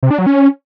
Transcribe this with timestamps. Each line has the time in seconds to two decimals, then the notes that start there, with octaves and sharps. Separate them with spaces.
0.03 C3
0.11 D4
0.19 F#3
0.27 C#4